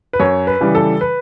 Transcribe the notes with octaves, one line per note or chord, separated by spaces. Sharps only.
B4
F#2 C#5
B4
C#3 E3 G3
A4
B4